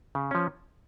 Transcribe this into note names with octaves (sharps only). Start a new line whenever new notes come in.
C#3
F3 C#4